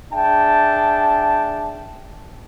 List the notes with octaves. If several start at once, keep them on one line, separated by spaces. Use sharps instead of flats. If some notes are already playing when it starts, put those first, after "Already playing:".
D4 G#4 E5 G5 A5